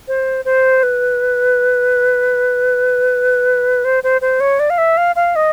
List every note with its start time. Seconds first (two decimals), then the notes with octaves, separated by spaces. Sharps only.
0.08 C5
0.45 C5
0.83 B4
3.85 C5
4.04 C5
4.22 C5
4.40 C#5
4.60 D5
4.70 F5
4.78 E5
4.97 F5
5.16 F5
5.36 D#5